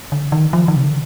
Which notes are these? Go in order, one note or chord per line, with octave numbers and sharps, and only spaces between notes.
D3
D#3
F3
D#3
C3
D3